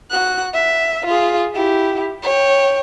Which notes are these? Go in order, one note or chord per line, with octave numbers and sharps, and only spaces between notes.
F#4 F#6
E5
F4 G#4
E4 G4
C#5 G5